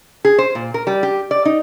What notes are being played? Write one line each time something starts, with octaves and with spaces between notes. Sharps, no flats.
G#4
C5
A#2
A#4
G3
G4
D5
D#4